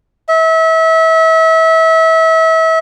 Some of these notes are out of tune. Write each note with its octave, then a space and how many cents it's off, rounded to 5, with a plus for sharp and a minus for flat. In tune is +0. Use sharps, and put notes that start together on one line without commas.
E5 -30